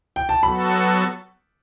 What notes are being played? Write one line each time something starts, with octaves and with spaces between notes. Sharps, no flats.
G5
A5
F#3 B3 F#4 A4 B5